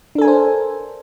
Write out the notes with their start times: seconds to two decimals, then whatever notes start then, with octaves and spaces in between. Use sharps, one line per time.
0.15 D4
0.18 A4
0.22 G#5
0.25 A#4
0.28 C5